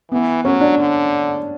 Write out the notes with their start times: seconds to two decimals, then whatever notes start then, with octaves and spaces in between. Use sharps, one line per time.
0.11 E3 B3
0.45 F#3 C#4
0.61 D4
0.79 D3